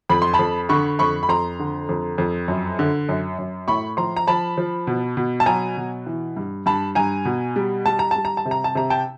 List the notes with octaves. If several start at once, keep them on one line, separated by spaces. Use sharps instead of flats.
F2 B5
C6
A5 B5
F2
D3 B5 C#6
F2 B5 C#6
B5
F2 A#5 C6
D3
F2
F2
F#2
D3
F#2
F#2
A2 B5 C#6
F3 A#5 C6
A#5
F3 A5 B5
F3
B2
B2
A5
F#3 G#5 A#5
B2
E3
G2
G2 A5 B5
G2 G#5 A#5
B2
G3
G3 A5
A#5
G3 A5
A#5
A5
C3
A#5
A5
C3 A#5
G5 A5